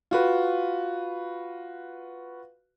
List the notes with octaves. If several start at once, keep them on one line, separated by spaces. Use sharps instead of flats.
F4 F#4 B4